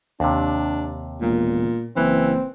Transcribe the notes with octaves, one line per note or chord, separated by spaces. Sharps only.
D#2 C3 D4
E1 A#2
F#1 E3 C4